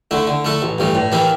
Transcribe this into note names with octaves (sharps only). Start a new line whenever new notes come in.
D3 A3 E4
D3
A3 E4 A4
A1
G2 E3 A3
A2
E3 A#3 E4 G4